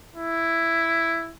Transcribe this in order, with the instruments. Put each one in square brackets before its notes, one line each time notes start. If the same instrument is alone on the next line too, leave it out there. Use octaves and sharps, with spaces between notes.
[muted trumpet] E4